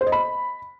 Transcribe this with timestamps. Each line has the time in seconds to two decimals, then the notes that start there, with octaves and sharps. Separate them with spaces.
0.01 C5
0.07 D#5
0.12 B5